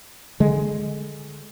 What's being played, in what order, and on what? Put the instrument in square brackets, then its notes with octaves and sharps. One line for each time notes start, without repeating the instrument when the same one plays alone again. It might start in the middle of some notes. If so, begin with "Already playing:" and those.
[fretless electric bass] D3 G#3